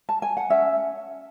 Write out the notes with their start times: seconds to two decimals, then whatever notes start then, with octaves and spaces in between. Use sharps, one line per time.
0.09 A5
0.22 G#5
0.37 F#5
0.50 C#4 E5